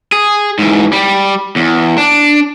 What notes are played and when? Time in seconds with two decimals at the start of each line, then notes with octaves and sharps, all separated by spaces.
0.12 G#4
0.59 G#2 E3
0.93 G3
1.56 E2
1.98 D4